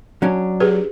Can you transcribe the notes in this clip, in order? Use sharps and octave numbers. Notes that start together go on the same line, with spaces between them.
F#3 C#4 D4
G4 G#4 B4